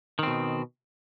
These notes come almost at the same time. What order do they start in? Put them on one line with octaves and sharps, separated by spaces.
D#3 C4 B2